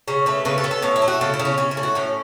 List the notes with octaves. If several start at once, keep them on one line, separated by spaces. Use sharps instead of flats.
C#3 C#4
A3 B4
C#3 B4
A4
B3
A4
A2 C#4
E4
A3
F#4
C#3 A4
E4
C#3
C#4
C#3 C#4
E4
A3
F#4
A2 C#4